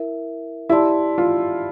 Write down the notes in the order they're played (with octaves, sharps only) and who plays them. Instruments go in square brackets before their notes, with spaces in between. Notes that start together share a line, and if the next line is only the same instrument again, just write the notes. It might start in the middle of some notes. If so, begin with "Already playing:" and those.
Already playing: [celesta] E4 A#4 E5
[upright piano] E4 [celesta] G4 D5 A5 C6
[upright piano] F4